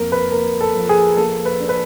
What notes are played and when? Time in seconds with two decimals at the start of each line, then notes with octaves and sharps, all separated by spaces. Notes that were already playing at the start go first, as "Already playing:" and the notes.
Already playing: F2 A#3 A#4
0.12 B4
0.32 A#3 A#4
0.61 A4
0.75 F3
0.89 G#4
1.17 A#3 A4
1.45 B4
1.60 D4
1.69 B4